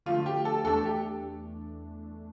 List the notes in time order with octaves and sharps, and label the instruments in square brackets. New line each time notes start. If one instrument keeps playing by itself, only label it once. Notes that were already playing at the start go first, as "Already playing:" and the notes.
[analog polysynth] D3 F3 A3 [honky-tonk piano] F4
[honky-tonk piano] G4
A4
[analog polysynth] E2 E3 A3 D4 [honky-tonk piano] A4
[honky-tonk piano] G4